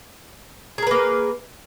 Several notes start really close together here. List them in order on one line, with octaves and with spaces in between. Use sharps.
G#4 A#4 B4 A#3